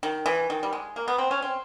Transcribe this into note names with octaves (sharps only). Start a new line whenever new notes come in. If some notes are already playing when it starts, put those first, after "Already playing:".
D#3
E3
D#3
G3
G#3
A#3
B3
C4
C#4
C4